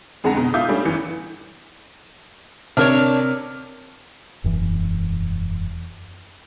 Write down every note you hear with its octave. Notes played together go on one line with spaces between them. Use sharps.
F2 D3 G#3 F#5 A5 A#5
B2
F4 E5 D6 D#6 G6
G3 A3 C#4 D4
G1 E3 C#7
C3 D4 A#4 C#5 F6
E1 F#2 E3